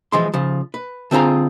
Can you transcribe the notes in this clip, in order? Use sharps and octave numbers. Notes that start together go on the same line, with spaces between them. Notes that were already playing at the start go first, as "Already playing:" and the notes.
E3 F3 G#3 C6
C#3 F3
B4
D3 C4 F4 G#4 A#5